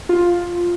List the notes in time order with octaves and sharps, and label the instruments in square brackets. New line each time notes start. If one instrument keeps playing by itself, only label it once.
[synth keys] F4